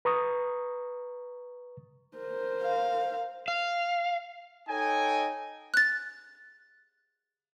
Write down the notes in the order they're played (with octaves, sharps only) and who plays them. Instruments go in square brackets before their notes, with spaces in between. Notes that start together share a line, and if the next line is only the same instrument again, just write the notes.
[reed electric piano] B4 A#5 C#6 D#6
[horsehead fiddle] A#4 C5
[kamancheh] F5
[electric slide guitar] F5
[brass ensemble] D#4 A4 C#5 D#5 G5 G#5
[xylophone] F#6 A6